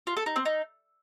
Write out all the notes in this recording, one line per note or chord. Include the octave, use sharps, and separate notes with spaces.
F4
A4
D#4
C4
D#4